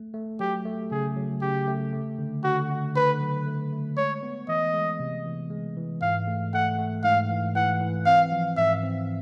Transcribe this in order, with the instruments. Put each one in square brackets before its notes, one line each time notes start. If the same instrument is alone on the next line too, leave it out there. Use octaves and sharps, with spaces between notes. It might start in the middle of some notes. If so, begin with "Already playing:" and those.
Already playing: [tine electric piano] A3
A3
[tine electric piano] F#3 [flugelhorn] G4
[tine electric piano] A3
[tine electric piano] C#3 [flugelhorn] G#4
[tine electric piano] F#3
[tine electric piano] C#3 [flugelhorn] G4
[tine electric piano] A3
A3
D3
[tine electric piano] D3 [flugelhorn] F#4
[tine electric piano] A3
[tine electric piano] D3 [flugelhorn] B4
[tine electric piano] F#3
A3
A3
[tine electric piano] G#3 [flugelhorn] C#5
[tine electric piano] B3
[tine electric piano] E3 [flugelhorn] D#5
[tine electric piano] G#3
C3
E3
G#3
E3
[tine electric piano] G#2 [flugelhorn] F5
[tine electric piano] A3
[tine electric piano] A3 [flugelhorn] F#5
[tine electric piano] A3
[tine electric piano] G#2 [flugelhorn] F5
[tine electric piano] E3
[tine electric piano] E3 [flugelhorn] F#5
[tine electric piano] E3
[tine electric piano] C4 [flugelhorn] F5
[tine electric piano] F3
[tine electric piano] G#2 [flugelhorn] E5
[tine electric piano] C4